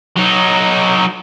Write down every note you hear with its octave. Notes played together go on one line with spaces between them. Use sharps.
F#3 D#4